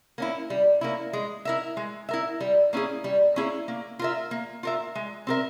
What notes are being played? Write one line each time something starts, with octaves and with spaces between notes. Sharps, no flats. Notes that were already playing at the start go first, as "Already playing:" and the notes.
A#3 C#4 E4
G3
A#3 C#4 E4
G#3
E4 A#4 E5
G#3
E4 A#4 E5
G3
A#3 C#4 E4 G#4
G3
A#3 C#4 E4 G#4
A#3
F4 A#4 E5
A#3
F4 A#4 E5
G#3
C4 G4 A#4 E5